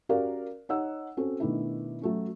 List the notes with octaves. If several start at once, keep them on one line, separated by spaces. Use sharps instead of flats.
C#4 F#4 G4 A#4 D5 F5
D#4 C#5 F#5 E6
C4 C#4 F#4 A4
B2 D#3 A3 D4 E4
F#3 A3 C#4